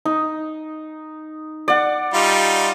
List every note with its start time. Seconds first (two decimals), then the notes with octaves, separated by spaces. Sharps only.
0.05 D#4
1.68 D5 F#5
2.14 G3 D#4 F4